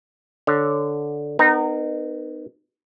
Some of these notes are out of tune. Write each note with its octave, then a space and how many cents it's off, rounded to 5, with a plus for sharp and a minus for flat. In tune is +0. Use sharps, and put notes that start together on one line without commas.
D3 +0 C#5 +0
B3 +30 D#4 -25 A#4 +0